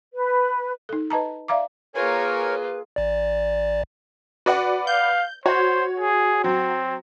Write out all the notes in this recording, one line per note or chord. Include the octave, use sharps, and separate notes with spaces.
B4
D#4 A4
B4 D#5 A5 A#5
D5 E5 F5 A#5 D6
A#3 F4 G#4 A#4 B4 C#5 G#5
A1 D5
F#4 B4 D5 F#5
F5 G6
F#4 C5 C#5
G#4
F#3 C4